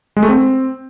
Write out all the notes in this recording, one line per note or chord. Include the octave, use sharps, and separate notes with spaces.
G#3
A3
C4